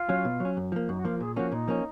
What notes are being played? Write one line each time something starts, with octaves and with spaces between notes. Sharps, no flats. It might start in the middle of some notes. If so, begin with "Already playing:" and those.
Already playing: F4
F#3 C#4
B2
F#3 C#4
F#2
F3 A#3
F#2 D#4
F#4
F3 A#3 F4
A#2 G#4
F3 A#3 C#4 F#4
A#2 D#4
F3 A#3 C#4